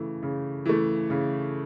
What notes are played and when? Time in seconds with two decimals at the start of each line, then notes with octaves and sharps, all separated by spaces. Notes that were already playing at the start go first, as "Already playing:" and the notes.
Already playing: C#3 E3 A3
0.23 C#3
0.66 E3 A3
1.10 C#3